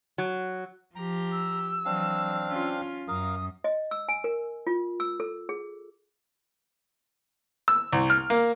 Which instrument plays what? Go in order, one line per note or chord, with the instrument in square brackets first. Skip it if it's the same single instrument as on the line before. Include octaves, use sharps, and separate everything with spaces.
[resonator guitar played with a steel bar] F#3
[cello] F3 G4 [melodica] A#5
[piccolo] E6
[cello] E3 F#3 [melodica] C4 D4 F5
[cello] C#4 F4
[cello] F#2 [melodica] A#4 F5 [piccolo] D#6
[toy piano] D#5
E6
G#5
A#4
F4
E6
A4
G#4
[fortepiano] E6
C2
F6
A#3